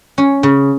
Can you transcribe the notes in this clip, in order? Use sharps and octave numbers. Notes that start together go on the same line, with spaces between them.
C#4
C#3